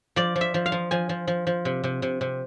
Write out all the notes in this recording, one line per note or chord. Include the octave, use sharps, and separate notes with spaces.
F3 D5
F3
E5
F3
F5
F3
F3 G#5
F3
F3
F3
C3
C3
C3
C3